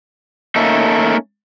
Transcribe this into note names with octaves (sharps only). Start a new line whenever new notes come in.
A3 A#3 C#4 D#4 A4